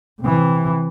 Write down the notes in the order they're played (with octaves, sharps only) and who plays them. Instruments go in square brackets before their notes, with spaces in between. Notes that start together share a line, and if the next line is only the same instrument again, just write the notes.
[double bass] C3 E3